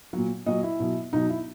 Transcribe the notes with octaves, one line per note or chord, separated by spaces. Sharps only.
A#2 F#3
A#2 F#3 D#5
E4
B2 F#3
B2 F#3 D#4
E4